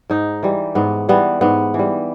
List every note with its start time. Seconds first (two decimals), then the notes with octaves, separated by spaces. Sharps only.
0.10 G#2 D#4
0.43 E3 G3
0.75 G#2 B3
1.09 E3 G3 B3
1.41 G#2 B3
1.74 E3 G3